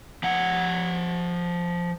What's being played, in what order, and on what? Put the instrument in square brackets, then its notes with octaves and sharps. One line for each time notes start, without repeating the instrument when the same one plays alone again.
[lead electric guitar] F3 F#5